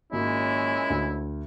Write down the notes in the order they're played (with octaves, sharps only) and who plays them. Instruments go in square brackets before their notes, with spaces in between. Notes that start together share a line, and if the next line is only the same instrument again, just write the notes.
[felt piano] G#1 A#3 F#4 [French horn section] A#2 G#3 C#4 [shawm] E4
[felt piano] D2